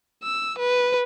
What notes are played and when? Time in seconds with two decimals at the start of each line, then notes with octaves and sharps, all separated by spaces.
0.23 E6
0.59 B4